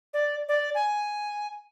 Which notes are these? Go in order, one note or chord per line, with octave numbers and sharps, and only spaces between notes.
D5
D5
G#5